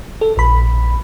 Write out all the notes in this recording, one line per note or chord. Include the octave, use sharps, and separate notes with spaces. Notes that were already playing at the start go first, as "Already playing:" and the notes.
A4
A#1 B5